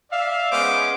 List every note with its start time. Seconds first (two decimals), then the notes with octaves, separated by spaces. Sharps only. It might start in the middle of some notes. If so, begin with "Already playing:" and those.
0.11 D5 E5 F5
0.51 G#3 B3 C#4 C5 D6